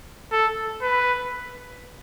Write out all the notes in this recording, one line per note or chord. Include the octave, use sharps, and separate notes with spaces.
A4
B4